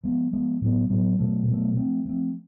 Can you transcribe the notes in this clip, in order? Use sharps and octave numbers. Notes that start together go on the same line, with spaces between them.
F3 G#3 B3
F3 G#3 B3
A2 F#3 B3
A2 F#3 B3
B2 F#3 A3
B2 F#3 A3
F3 A3 C4
F3 A3 C4